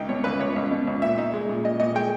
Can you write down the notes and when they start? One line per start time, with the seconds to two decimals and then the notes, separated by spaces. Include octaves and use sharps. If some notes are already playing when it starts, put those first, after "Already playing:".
Already playing: C#2 D#4 G5
0.09 B2 C#5
0.24 C#2 B4
0.40 C#2 C#5
0.56 C#2
0.71 B2
0.87 C#2
1.02 A#2 E5
1.18 D#4
1.34 G#3
1.49 A#2
1.64 A#2 D#5
1.80 A#2 D#5
1.95 G#3 G5